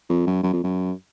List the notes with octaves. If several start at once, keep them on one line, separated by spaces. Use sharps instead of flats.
F2
F#2
F#2
F2
F#2